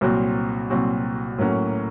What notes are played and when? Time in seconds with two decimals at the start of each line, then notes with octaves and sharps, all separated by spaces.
0.01 C2 A#2 F#3 C4 F#4
0.70 C2 A#2 F#3 C4 F#4
1.38 A2 F#3 A#3 C#4 F#4